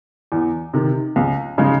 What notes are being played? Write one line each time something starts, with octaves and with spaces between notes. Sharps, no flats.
E2
C3 D#3
C#2
C#3 G#3 D#4